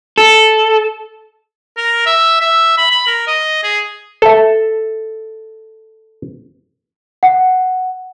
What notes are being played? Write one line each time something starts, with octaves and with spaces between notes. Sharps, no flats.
A4
A#4
E5
E5
B5
B5
A#4
D#5
G#4
A4 E5
F#5